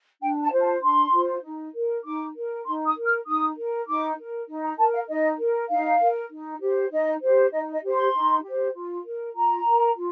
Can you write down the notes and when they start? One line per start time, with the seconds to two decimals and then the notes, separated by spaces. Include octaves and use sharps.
0.21 D4 G5
0.42 A5
0.52 F4 C5
0.62 A5
0.82 D4 C6
1.12 F4 C5
1.43 D#4
1.73 A#4
2.04 D#4 D6
2.35 A#4
2.65 D#4 C6
2.85 D#6
2.95 A#4
3.05 F6
3.26 D#4 D#6
3.56 A#4
3.87 D#4 D6
4.17 A#4
4.48 D#4
4.64 A#5
4.78 A#4 A5
4.93 F5
5.08 D#4 D#5
5.39 A#4
5.69 D#4 F5
6.00 A#4
6.30 D#4
6.61 G4 C5
6.91 D#4 D#5
7.22 G4 C5
7.52 D#4 D#5
7.72 D#5
7.83 G4 C5
7.93 C6
8.13 D#4
8.43 G4
8.48 C5
8.74 F4
9.04 A#4
9.35 F4 A#5
9.65 A#4
9.95 F4